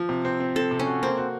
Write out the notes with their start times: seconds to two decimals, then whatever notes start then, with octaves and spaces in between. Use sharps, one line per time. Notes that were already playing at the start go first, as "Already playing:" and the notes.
Already playing: F3
0.09 C3
0.25 C4
0.40 C4
0.56 C4 A4
0.71 C3
0.79 C#4
0.86 F#4
1.03 A#3 C4
1.18 F#4